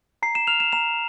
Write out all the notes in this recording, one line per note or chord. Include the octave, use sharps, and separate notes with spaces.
A#5 C7
E7
F6 F7
E7
A#5 E7